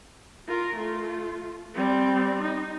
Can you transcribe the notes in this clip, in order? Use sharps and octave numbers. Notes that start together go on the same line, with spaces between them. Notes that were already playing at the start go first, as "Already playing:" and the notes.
F4 A#4
A3 F4
G3 C4
D#4